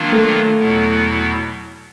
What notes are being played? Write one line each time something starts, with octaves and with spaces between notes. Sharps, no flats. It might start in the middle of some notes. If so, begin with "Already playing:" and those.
Already playing: D#3 F#3 A#3 D4 F4
A3 A4
E2 B2 F#3 B3 E4